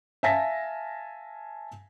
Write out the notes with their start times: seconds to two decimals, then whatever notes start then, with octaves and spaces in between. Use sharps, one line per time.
0.23 E5 F5 G#5 A5 A#6 B6